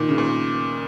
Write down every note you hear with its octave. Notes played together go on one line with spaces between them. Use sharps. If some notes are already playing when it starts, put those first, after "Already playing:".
Already playing: A#2 D#3
C#3
A#2